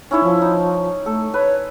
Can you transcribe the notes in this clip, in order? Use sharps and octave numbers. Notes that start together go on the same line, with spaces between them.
C#4 D#4 E4 C#5
F3
D#4
A3 A4
B4 C#5